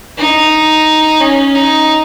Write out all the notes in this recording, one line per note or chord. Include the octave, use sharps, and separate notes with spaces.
D#4
C#4
D#4